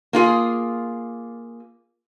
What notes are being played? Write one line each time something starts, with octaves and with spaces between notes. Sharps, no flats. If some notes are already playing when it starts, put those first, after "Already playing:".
A#3 F4 G#4